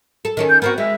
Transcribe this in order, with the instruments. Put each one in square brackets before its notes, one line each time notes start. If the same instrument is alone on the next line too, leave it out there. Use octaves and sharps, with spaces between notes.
[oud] A4
D#3 C#4 A4
[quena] G6
[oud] B3 C4 F#4 [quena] A#4
[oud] G#3 [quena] E5